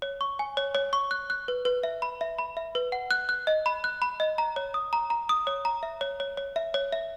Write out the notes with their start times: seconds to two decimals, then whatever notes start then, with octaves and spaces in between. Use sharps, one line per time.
0.02 C#5
0.21 C#6
0.39 G#5
0.57 C#5
0.75 C#5
0.93 C#6
1.11 F#6
1.30 F#6
1.48 B4
1.65 B4
1.83 E5
2.02 B5
2.21 E5
2.39 B5
2.57 E5
2.75 B4
2.92 F#5
3.11 F#6
3.29 F#6
3.47 D#5
3.66 B5
3.84 F#6
4.02 B5
4.20 D#5
4.38 A#5
4.56 C#5
4.74 D#6
4.93 A#5
5.10 A#5
5.29 D#6
5.47 C#5
5.65 A#5
5.83 E5
6.01 C#5
6.20 C#5
6.37 C#5
6.56 E5
6.74 C#5
6.92 E5